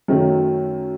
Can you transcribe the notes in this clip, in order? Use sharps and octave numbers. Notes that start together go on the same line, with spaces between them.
F#2 D#3 F#3 A3